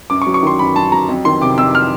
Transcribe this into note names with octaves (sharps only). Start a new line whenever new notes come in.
F#2 D6
C#6
F#3
C#6
D#3 C6
F#2 B5
F#2 A5
F#3 A#5
F2
D#3 C6
C3 D6
F2 E6
F6